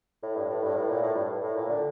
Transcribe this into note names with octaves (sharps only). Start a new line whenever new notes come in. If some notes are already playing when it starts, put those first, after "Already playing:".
A2
G2
A2
G2
A2
A#2
A2
G2
A2
A#2
D3